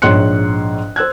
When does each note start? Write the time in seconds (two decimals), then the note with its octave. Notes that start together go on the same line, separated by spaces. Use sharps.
0.02 A#1 G#2 C#5 C6 F#6 C#7
0.96 C5 E6 F#6 G#6